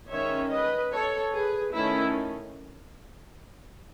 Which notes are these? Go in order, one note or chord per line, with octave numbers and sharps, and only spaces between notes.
D#3 G#3 C#4 C#5 E5
B4 D#5
A4 C#5
G#4 B4
D#3 A3 C#4 E4